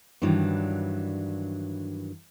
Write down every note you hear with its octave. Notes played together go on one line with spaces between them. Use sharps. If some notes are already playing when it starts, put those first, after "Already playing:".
G2 D#3 E3 F#3 D4